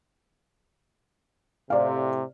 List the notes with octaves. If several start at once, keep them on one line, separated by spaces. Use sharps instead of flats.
A2 C3 D5 F5